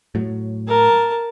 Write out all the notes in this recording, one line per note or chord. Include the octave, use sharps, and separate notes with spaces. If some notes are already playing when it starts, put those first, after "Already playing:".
A2 F#3
A#4 A5